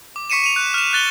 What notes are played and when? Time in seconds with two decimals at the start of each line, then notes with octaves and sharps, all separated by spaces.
0.16 D6
0.30 C#6 B6 C#7 D#7 E7
0.44 D#7 F7
0.56 F#6
0.74 F6 E7
0.93 F#6 A6 G7